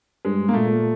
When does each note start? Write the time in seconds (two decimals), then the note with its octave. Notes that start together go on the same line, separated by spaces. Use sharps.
0.25 G2 G#3
0.48 A#3
0.54 A#2 A3